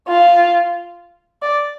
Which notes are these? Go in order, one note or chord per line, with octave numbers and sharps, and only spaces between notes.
F4
D5